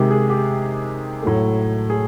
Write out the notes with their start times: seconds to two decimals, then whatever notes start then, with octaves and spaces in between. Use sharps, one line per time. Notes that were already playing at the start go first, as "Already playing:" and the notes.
Already playing: C3 D#3 G#3 G4
0.11 G#4
0.30 G4
1.22 A2 F#3 A3
1.90 G#4